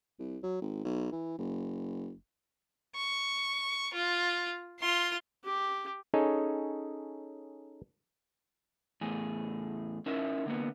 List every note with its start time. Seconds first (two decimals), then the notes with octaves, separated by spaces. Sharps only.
0.19 C2
0.43 F#3
0.62 G#1
0.84 B1
1.12 E3
1.38 F#1
2.96 C#6
3.94 F4
4.80 F4 C6
5.44 G4
6.14 C#4 D#4 G#4 A4 C#5 D#5
9.01 E2 A2 G#4
10.06 C#4 D#4 E4 A#4 E5
10.46 D3 A#3 B3